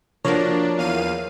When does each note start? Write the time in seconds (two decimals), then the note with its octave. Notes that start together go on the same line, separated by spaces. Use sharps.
0.25 F3 A#3 D4 F#4 A#4 C#5
0.77 E2 F5 D#7